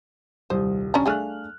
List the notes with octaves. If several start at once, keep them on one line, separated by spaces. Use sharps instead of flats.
D#1 C2 C5 D#6
C#4 D4 A#5
A3 D4 G#4 F5 F6 F#6